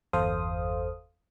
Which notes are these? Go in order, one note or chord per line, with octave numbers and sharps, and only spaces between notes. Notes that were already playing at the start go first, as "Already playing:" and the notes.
G1 E2 A4 C5 F5 D#6